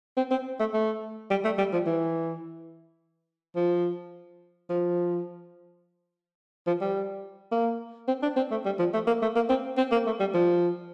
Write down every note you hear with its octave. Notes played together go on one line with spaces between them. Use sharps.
C4
C4
A3
A3
G3
A3
G3
F3
E3
F3
F3
F3
G3
A#3
C4
D4
C4
A3
G3
F3
A3
A#3
A3
A#3
C4
C4
A#3
A3
G3
F3